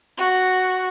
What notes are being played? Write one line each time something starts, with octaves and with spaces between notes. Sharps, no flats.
F#4